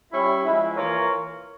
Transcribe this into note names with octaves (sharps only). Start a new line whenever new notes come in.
G3 C#4 E4
F3 G#3 E4
E3 A#3 F4 A#4 C#5